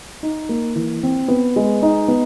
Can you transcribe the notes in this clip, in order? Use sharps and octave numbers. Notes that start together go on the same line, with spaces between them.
D#4
A#3
E3
C4
B3
G#3
D#4
B3